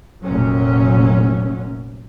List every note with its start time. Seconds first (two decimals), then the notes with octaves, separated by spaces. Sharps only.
0.23 F1 A#2 F#3 C#4